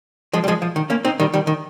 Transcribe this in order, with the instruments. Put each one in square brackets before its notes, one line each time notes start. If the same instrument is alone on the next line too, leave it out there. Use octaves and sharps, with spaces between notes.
[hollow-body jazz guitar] F3 G#3
G3
F3 G#3
F3
D#3
A#3 C#4
C4 D#4
D#3 G3
D#3 G3
D#3